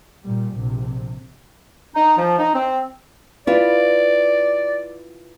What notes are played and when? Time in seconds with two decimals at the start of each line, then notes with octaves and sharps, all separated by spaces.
0.23 A#2 G3
0.57 A#1 C3
1.95 D#4
2.18 F3
2.38 D#4
2.54 C4
3.47 E4 F4 B4 D5